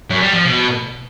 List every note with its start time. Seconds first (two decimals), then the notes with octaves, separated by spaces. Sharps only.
0.10 F#2
0.22 G3
0.34 F3
0.45 B2